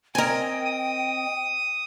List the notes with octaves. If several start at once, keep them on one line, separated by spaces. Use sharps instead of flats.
C4 A#4 D#5 G5 G#5
D#6